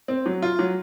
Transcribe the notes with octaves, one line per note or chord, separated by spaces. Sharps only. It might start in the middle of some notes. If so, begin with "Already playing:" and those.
C4
F#3
F4
F#3